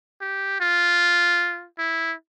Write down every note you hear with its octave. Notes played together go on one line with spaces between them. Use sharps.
G4
F4
E4